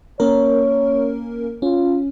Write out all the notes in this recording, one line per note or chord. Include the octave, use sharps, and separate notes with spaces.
A#3 C#4 A#4 C#5
C#4 F4